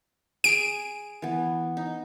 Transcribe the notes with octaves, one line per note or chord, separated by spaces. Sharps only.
G#4 G#5 D7
E3 B3
D#4